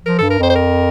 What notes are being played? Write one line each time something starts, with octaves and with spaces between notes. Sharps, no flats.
F3 A#4
G2 A4
A#4
F2 C5
C5
A#4